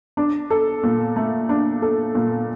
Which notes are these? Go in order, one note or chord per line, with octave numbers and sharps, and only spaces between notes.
D4
A4
A#2
A3
D4
A4
A#2